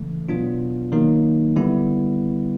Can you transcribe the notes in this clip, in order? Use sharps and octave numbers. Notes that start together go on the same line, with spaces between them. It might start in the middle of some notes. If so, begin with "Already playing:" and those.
Already playing: C#3 E3 A3
B2 F#3 B3 D4 F4
D#3 F#3 A#3 D#4
D3 G3 B3 E4